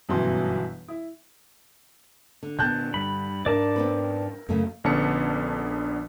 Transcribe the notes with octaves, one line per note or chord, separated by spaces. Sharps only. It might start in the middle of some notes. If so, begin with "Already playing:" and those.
G1 F#2 B2 E3 F#3 C6
E4
D3
A#2 B3 A5 F#6 G6
G2 B5
G#2 D4 A#4 D5 A5 D6
B3 C4 B4
F#2 C#3 A3 A#3
A#1 D3 B3 C#4 A5 C#7